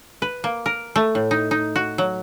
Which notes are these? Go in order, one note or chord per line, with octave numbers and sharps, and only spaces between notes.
B4
A#3
A#4
A3
A2
D#4
D#4
F#4
F#3